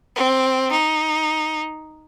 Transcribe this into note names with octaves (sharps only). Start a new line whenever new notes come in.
C4
D#4